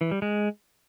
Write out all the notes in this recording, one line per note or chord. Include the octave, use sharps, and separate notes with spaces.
E3
G3
G#3